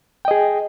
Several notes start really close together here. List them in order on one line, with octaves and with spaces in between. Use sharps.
G5 D#5 G#4